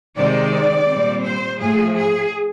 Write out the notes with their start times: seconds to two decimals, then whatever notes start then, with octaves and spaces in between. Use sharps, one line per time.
0.16 C3 D#3 G#3 C4 D5
0.88 A#2 G3 C4
1.23 C5
1.59 A2 F3 A3 G#4
1.96 G#4